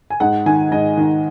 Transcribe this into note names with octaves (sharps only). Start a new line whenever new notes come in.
G#5
G#2 F#5
D#3 G#5
G#2 D#5
D#3